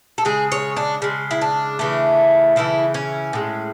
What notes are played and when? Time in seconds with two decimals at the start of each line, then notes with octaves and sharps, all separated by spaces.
0.18 A4
0.25 C#3 G#3 G#4
0.52 C#5
0.77 D4
1.02 C#3 G#3
1.31 E4
1.42 D4
1.79 C#3 E3 A3
2.56 C#3 E3 A3 E4
2.94 C#4
3.33 A2 G#3